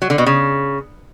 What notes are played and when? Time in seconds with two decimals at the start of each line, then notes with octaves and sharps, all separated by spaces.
0.02 F#3
0.10 D3
0.18 B2
0.27 C#3